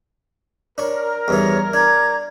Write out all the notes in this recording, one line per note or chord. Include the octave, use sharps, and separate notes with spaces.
D4 A#4 C#5
E2 G2 E3 C#5
D4 A#5 D6 G#6